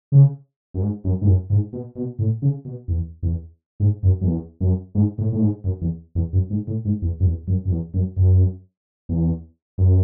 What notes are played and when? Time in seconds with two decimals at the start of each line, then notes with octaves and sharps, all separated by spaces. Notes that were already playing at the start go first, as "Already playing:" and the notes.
0.12 C#3
0.74 F#2
0.81 G#2
1.04 F#2
1.22 G#2
1.27 F#2
1.50 G#2
1.73 B2
1.95 B2
2.19 A2
2.42 C#3
2.65 B2
2.88 E2
3.23 E2
3.80 G#2
4.03 F#2
4.21 F#2
4.26 E2
4.61 F#2
4.95 G#2
5.18 A2
5.32 A2
5.41 G#2
5.64 F#2
5.81 E2
6.15 E2
6.33 F#2
6.50 G#2
6.67 A2
6.85 G#2
7.02 E2
7.20 F#2
7.25 E2
7.47 F#2
7.65 F#2
7.71 E2
7.94 F#2
8.16 F#2
9.09 E2
9.78 F#2